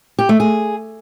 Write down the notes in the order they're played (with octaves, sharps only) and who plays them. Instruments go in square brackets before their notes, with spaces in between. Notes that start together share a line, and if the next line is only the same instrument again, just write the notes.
[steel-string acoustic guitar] G4
A3
G#4